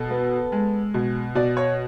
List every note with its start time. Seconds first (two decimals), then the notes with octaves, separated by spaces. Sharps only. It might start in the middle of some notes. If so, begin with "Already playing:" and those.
Already playing: B2 A4
0.10 B3
0.52 G#3
0.94 B2
1.35 B2 D5
1.57 C#5